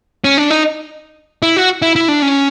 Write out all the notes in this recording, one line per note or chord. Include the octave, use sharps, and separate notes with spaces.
C#4
D4
D#4
E4
F#4
E4
E4
D4
C#4